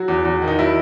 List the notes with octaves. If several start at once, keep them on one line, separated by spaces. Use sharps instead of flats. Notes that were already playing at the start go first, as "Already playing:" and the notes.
Already playing: F#3 F#4
E2
E2
D#3
D#4
F#3 E4